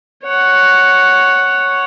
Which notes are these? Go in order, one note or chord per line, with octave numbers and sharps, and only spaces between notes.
C#5 F#5